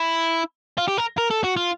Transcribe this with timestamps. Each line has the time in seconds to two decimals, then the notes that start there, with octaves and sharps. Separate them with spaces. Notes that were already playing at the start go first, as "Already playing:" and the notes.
Already playing: E4
0.78 F4
0.88 G4
0.97 A#4
1.17 A#4
1.30 A4
1.44 F#4
1.57 F4